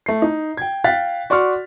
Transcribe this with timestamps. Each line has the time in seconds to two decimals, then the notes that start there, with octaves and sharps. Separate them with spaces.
0.06 A3 C7
0.22 D#4
0.57 G5 G#6
0.84 F5 G5 F#6 A6 B6
1.30 F#4 D5 C6 C#6 F6